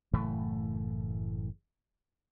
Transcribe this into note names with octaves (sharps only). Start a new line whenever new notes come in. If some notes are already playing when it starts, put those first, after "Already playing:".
F#1 A2 E3 A3